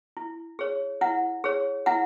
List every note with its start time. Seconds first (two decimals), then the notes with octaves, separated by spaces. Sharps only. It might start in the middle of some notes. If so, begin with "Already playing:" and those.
0.17 E4
0.59 G#4 C#5
1.01 E4 F#5
1.44 G#4 C#5
1.86 E4 F#5